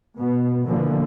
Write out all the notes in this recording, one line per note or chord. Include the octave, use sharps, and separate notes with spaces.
B2 B3
B2 D3 E3 F3 A#3